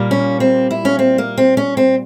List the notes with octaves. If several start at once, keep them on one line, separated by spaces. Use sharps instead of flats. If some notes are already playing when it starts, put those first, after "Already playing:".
Already playing: A#2 G3 A#3
C#4
C4
E4
C#4
C4
A#3
C4
C#4
C4